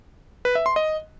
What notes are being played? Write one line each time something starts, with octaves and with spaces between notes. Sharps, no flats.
B4
E5
C6
D#5